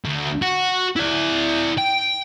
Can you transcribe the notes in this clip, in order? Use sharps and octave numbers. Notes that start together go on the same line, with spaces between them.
D2
F#4
E4 D5
G5